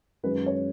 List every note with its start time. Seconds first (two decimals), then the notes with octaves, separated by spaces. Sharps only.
0.23 F#2 D#3 G#3 B4
0.46 C#5